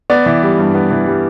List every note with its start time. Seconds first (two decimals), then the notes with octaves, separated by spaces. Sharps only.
0.10 B3 D5
0.26 E3
0.43 G3
0.58 G2
0.75 B3
0.91 E3
1.07 G3